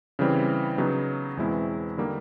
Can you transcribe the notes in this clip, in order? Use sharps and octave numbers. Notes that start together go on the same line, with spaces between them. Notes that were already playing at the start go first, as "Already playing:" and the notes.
C#3 E3 G3 C4
C#3 F#3 B3 D#4
E2 B2 G#3 C4 E4
D3 G3 A#3 D#4